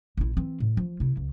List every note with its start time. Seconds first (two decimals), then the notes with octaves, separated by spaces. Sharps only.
0.17 A#1 E4
0.37 E3 C4
0.60 A2
0.77 F3
1.00 C3 E4
1.17 C#2